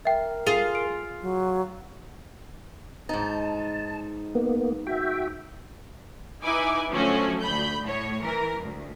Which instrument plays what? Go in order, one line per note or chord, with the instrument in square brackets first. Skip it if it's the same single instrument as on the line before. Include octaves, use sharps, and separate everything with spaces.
[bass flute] A#4 [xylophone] E5 G5
[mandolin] F4 [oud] G#4
[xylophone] D7
[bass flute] F#3
[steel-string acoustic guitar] G#2 D#4 [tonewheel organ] A5
[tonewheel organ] A#3 B3
F#4 E5 G5
[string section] D#4 E4 B4 G#5 D6
D3 F3 F#3 A3 C#4 F#4
D2 B5 G6
A2 C#5
E3 A#4
D2